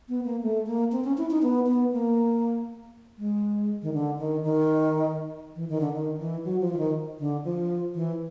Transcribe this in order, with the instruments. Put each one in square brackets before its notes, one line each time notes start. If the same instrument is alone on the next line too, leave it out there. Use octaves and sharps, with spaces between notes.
[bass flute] B3
A#3
A3
A#3
C4
C#4
E4
D#4
B3
B3
A#3
G#3
D#3
D3
D#3
D#3
E3
D#3
D3
D#3
E3
F#3
F3
E3
D#3
D3
F3
E3